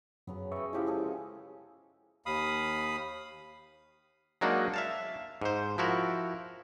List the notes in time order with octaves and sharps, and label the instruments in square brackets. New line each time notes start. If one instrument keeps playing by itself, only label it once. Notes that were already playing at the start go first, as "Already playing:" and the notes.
[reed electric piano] F#2 [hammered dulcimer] C#3 F#3 B3
[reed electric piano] B4 E5 C#6 [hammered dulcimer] D#5 G5
[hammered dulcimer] C#3 F3 G#3 [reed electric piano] E4 G4 F5
[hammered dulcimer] G#3 G#4 A4
[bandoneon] D#2 F5 B5 D#6
[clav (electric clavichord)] F#3 G#3 A#3 D4 D#4 F#4
E5 F5 A5
G#2 C5
F3 E4 F#4 A#4